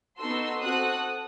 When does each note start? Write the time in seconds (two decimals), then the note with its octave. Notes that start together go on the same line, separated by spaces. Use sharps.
0.17 B3 D#4 F#4 A4 C6 E6
0.61 C4 F#4 A4 D#6 F#6